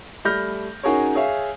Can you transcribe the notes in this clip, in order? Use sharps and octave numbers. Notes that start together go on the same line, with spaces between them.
G3 A3 B5 F6 G6 A#6
C#4 D#4 F#4 G#4 A#4 C#5
G#4 C#5 E5 F5